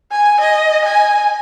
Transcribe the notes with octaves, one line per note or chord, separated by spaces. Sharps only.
G#5
D#5
G#5